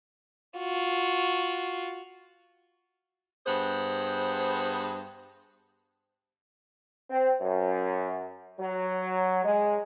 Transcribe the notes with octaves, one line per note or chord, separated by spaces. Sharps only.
F4 F#4
G2 B3 G#4 C5
C4
F#2
F#3
G#3